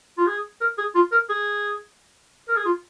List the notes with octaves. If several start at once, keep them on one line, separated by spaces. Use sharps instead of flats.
F4
G#4
A#4
G#4
F4
A#4
G#4
A#4
G#4
F4